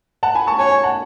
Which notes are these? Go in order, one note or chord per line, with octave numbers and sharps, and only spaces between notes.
F#5 A5
G#5 B5
A5 C#6
C#5 G#5
G#5
F#5 A5